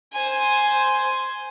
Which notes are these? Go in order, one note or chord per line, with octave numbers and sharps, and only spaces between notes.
C5 G#5